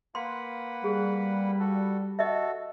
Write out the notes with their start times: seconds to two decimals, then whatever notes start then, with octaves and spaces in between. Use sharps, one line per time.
0.15 A#3 B4 F#5 C6
0.84 G3 G#4
1.60 F#4 A4
2.19 F#4 A4 D#5 E5